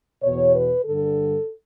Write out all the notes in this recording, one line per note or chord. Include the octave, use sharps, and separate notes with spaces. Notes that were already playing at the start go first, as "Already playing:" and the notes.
E2 B2 C#5
B4
G2 D3 A4